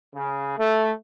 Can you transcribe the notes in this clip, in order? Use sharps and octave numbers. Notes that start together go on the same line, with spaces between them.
C#3
A3